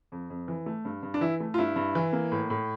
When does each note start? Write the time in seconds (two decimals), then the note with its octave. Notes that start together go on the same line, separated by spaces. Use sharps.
0.12 F2
0.30 F2
0.48 E3
0.66 A3
0.85 G2
1.03 G2
1.14 D4
1.21 E3 E4
1.40 A3
1.54 F4
1.58 G2 E4
1.76 G2
1.95 E3
2.13 A#3
2.32 A2
2.50 A2